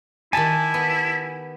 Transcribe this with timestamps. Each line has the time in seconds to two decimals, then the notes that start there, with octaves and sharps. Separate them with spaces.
0.33 D#3 E4 G4 G#5 A5 B5
0.74 B3